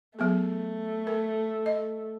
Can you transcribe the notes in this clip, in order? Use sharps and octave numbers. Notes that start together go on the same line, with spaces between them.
F#3 A3 B3 G#4
A#4
D#5